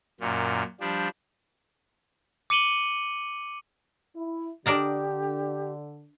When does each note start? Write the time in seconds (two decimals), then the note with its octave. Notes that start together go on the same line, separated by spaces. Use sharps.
0.20 F#2 A#2
0.80 F3 G3 D4
2.50 D6 C#7 D#7 F#7 G7
4.16 E4
4.66 D3 D4 G4 A#4 D#5